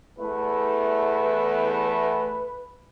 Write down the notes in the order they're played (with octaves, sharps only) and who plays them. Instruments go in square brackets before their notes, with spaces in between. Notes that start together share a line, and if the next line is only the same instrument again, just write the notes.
[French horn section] E2 A3 [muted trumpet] B4